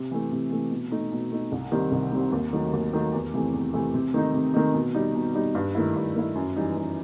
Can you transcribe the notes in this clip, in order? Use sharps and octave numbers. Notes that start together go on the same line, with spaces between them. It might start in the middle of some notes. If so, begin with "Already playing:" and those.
Already playing: C3
E3 A3
C3
E3 A3
B2
A3 D#4
B2
A3 D#4
C2
C3 D#3 G3 C4
C2
C3 D#3 G3 C4
D#2
D#3 F#3 A3
D#2
D#3 F#3 A3
E2
C3 E3 A3
E2
C3 E3 A3
C3
D#3 A3 D#4
C3
D#3 A3 D#4
B2
G3 D#4
B2
G3 D#4
G2
D#3 A3 E4
G2
D#3 A3 E4
F#2
E3 G3 D#4
F#2